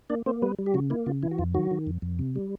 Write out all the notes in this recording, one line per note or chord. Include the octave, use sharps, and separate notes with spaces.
A#3 D4 D5
A#3 C4 C5
G3 B3 B4
G3
G4
C#3 F#3 F#4
A#3 E4
C#3 F4
E3 E4
F#4
F2 F4
D#3 F#3 F#4
D#3
F2
F2
C3
G3